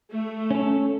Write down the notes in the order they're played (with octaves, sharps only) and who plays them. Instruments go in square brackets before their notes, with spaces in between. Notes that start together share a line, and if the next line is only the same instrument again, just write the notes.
[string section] A3
[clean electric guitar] C#4 A4